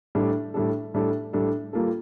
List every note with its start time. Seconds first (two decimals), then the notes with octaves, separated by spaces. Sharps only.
0.15 A2 G3 D4 A4
0.54 A2 G3 D4 A4
0.94 A2 G3 D4 A4
1.33 A2 G3 D4 A4
1.73 G3 A#3 F4 A4